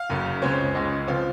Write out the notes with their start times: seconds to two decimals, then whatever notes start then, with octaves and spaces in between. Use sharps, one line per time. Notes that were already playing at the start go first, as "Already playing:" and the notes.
Already playing: F5
0.10 F#1 F#2 C#3
0.42 C#2 C#3 G#3 C4 C#5
0.75 C#2 C#3 G#3 D#5
1.08 C#3 F3 C4 F5